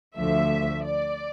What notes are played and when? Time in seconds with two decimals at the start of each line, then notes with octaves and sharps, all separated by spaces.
0.17 D2 D3 F3 A3 E5
0.85 D5